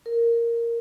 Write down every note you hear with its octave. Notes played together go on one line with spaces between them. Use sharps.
A#4